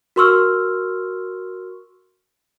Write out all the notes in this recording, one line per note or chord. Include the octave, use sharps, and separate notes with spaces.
F#4 A#4 C6 C#6 E6 F6